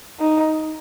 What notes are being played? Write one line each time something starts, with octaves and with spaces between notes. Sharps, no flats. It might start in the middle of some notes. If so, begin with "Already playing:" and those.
D#4